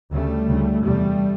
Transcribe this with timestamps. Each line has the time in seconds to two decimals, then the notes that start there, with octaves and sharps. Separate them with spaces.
0.11 D2 C#3 G3 A3
0.48 D2 C#3
0.83 E2 C3 G3 A3